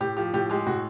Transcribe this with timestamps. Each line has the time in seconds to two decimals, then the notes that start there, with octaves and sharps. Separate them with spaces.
0.01 A2 G4
0.17 F3 G4
0.34 A2 G4
0.50 G#3 G4
0.67 A2 F#4